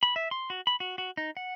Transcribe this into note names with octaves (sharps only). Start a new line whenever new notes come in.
B5
E5
C6
F#4
B5
F#4
F#4
D#4
F#5